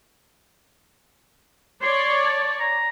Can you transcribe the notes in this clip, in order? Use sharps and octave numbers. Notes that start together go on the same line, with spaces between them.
C#5 D5 C6
A5
A#5